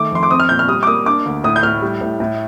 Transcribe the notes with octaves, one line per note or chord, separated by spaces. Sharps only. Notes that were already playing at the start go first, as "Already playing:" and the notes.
Already playing: D#3 A3 D6
F2 C6
D6
C4 D#6
F6
A#2 G6
F6
G3 D#6
D6
A#3 D#6
D4 D6
D2
A2 D#6
G6
A2 F6
G3
A2
A2